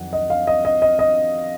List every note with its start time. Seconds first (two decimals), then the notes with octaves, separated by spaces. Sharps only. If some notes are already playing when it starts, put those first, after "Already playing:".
Already playing: F2 D#3 F#3 F#5
0.13 D#5
0.30 F5
0.47 D#5
0.65 D#5
0.82 D#5
0.99 D#5